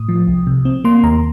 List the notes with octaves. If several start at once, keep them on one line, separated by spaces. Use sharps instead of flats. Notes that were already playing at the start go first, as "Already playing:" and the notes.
Already playing: A2 D#6
F3
C2
C3
C4
A#3 C6
D#2 A#5